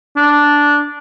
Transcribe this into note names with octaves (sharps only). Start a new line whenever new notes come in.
D4